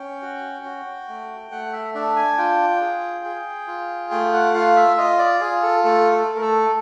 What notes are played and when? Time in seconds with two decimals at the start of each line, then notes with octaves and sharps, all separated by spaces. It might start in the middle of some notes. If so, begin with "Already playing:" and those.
Already playing: C#4 G5
0.22 F#4
0.65 F#4
1.08 A3
1.51 A3 F#5
1.73 E5
1.95 D4 E5
2.16 G#5
2.38 F4 G5
2.81 G#4
3.25 G#4
3.67 F4
4.11 A3 G5
4.33 F#5
4.54 F4 F5
4.76 E5
4.97 F4 D#5
5.19 D5
5.41 F4 G#4
5.62 A4
5.84 A3 A4
6.12 A4
6.27 A3
6.36 A#4
6.41 A4